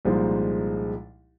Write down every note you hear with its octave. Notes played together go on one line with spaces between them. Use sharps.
C2 A#2 F3 G#3 D#4